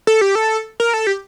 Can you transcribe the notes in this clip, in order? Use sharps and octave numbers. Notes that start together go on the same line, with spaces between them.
A4
G4
A4
A#4
A4
G4